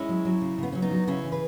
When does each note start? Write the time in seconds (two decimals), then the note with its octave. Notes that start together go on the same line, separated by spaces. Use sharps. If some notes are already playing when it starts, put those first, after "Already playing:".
Already playing: G#3 C#4 E4
0.09 F#3
0.25 F#3
0.41 C#3
0.58 C#3 B3
0.72 F#3 C#4
0.82 B3 D#4
0.91 F#3
1.07 C#3 C#4 E4
1.23 E3
1.32 G#4 B4